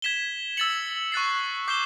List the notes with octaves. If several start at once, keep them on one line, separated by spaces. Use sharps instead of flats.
G#6 B6 E7 G7
E6 A6 C#7 F#7
C#6 F#6 A6 C7
D6 G6 C7 E7 G7